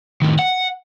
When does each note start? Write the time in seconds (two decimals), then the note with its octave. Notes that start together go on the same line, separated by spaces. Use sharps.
0.22 A2 D#3
0.39 F#5